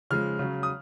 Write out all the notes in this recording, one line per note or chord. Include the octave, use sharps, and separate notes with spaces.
C#3 F3 G#3 F6
C#3 F#3
D#6